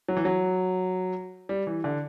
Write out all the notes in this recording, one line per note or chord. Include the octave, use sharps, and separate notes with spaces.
F#3
E3
F#3
G3
E3
D3